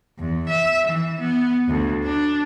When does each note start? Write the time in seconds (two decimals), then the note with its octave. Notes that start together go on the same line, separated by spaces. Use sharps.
0.19 E2
0.49 E5
0.87 E3
1.20 B3
1.68 D2
2.04 D4